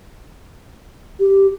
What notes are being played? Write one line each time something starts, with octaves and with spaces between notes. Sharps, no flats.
G4